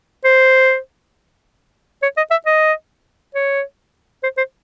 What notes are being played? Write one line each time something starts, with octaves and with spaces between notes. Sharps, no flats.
C5
C#5
D#5
E5
D#5
C#5
C5
C5